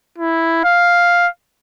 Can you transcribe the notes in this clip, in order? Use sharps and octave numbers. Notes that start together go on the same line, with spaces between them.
E4
F5